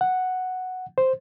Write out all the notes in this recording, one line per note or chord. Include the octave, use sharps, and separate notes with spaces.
F#5
C5